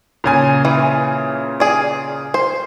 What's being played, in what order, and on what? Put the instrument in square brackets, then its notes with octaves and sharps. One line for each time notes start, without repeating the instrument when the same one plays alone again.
[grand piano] A#2 C#3 G#5
[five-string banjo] E3
G#4 D5
C5